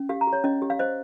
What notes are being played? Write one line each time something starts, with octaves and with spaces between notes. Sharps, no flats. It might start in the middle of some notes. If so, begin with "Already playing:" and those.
Already playing: C#4
G4 F5
A#5
G4
C#5
C#4 D#5
G4
F5
C5 D#5